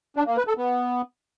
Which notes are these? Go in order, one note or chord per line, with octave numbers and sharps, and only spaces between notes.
D4
A#3
B4
A4
B3